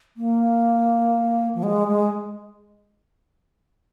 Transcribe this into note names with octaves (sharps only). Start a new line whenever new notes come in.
A#3
F3
G#3
G#3